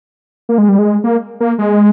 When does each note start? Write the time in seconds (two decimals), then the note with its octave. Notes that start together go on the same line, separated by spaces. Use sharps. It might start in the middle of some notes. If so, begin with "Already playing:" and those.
0.49 A#3
0.58 G#3
0.69 G3
0.79 G#3
1.04 A#3
1.40 A#3
1.59 G#3